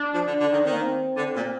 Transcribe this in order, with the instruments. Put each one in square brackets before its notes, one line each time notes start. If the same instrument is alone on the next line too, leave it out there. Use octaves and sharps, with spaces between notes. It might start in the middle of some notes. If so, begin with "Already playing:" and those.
Already playing: [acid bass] D4
[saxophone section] F3
D3
D3
D#3
[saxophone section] D#3 [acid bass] C4
[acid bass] A#3
C4
[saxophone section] D3
A#2